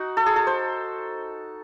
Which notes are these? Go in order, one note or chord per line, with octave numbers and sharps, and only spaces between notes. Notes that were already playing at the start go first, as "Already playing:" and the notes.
Already playing: D#4 F#4
A4
G#4
A4
C5